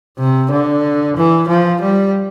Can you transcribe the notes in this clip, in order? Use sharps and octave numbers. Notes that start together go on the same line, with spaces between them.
C3
D3
E3
F3
G3